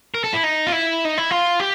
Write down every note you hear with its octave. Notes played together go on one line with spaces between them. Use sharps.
A#4
A4
E4
D#4
F4
E4
D#4
E4
F4
G4